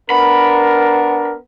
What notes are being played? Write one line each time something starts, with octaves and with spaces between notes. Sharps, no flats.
B3 D4 A#4 B5